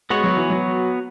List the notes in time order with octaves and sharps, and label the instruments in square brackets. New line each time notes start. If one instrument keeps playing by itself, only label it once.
[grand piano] G#3 [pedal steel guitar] B3 F#4 C#5
[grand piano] F#3
E3
F#3